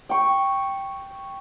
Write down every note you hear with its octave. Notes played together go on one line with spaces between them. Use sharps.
G5 C#6